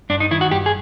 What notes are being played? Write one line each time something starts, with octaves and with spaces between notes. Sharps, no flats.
G2 D4
D#4
D#3 E4
F#4
G2 G4
G#4